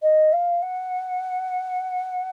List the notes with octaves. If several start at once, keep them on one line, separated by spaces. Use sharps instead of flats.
D#5
F5
F#5